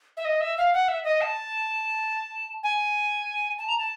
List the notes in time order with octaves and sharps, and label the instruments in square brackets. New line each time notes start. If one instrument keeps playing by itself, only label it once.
[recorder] E5
D#5
E5
F5
F#5
E5
D#5
A5
G#5
A5
A#5
A5